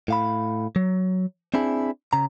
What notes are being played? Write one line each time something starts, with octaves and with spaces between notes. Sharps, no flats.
A2 F5 B5
F#3
C4 D4 E4 G#4
C#3 A#5